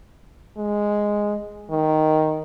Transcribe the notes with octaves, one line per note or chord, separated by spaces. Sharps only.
G#3
D#3